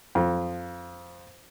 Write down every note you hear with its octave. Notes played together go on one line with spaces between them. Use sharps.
F2